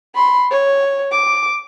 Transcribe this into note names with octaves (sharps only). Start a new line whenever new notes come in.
B5 C6
C#5
D6